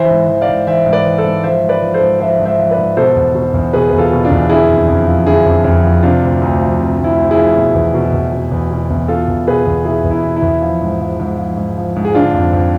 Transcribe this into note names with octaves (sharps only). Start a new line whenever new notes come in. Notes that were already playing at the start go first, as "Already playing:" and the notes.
Already playing: E3 C5 E5
G#2
E3
D5 F5
G#2
E3 C5 E5
G#2
B4 D5
E3
A4 C5
G#2
F3 C5 E5
G#2
B4 D5
F3
A4 C5
G#2
F3 C5 E5
G#2
C5 E5
F3
B4 D5
G#2
B2 A4 C5
E2
B2
E2
B2 G#4 B4
E2 B4
F4 A4
B2
D4 F4
E2
D3 E4 G#4
F2
F2
F3
D3 E4 G#4
F2
F2
F3
C3 D4 F4
D2
D2
F3
C3
D2
E4
D2
E4 G#4
F3
B2
E2
B2
E2
B2
E2
B2
E2
B2 F4 A4
E2
B2 G#4 B4
E2
B2 E4 G#4
E2
E4
B2
E4
E2
F3
G#2
F3
G#2
F3
G#2
F3
G#2
G#4
D3 D4 F4
F2
F2